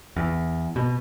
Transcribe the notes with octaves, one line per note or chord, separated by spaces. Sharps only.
E2
B2